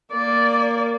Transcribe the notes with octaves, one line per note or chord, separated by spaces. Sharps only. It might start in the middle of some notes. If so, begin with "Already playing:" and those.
A#3 D5